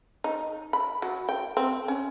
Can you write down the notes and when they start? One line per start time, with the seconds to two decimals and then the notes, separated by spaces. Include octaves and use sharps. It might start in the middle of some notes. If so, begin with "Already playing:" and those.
0.24 D#4
0.73 B5
1.02 F#3
1.29 G5
1.57 C4
1.88 C#4